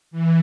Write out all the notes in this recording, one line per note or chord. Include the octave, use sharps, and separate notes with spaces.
E3